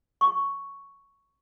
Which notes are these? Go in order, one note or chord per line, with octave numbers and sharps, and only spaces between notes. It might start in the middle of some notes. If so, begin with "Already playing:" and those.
C#6